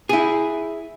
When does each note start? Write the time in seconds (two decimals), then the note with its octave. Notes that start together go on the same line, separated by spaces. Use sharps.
0.09 E4 G#4